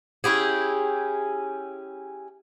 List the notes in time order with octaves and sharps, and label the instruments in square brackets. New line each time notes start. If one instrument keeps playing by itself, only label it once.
[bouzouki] C#4 E4 G4 G#4